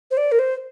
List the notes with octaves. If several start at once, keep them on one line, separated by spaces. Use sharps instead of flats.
C5
D5
A#4
C5